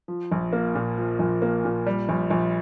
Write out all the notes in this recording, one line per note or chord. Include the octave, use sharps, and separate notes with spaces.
F3
A#1
A#3
A#2
F3
A#1
A#3
A#2
G3
A#1
A#1